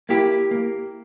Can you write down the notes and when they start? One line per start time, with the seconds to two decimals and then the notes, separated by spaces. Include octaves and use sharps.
0.09 A#3 E4 G4
0.51 A#3